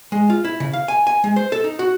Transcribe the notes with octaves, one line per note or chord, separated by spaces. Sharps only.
G#3
F4
E4
C#3
F5
G#5
G#5
G#3
C5
A4
D#4
F#4